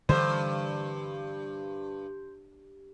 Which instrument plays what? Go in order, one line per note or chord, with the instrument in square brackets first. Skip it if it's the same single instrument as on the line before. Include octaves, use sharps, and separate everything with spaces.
[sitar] G2 [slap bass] D3 E3 G3 [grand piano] C5